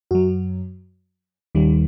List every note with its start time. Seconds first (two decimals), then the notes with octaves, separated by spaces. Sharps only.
0.11 F#2 F#3 F#4
1.55 D#2 D#3 G3